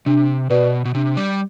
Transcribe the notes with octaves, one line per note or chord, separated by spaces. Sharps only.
C3 D4
B2 F#4 B4 D5
B2
C3 D4
G3